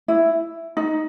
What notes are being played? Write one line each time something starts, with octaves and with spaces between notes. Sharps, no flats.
E4
D#4